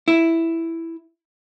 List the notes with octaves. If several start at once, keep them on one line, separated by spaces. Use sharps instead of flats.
E4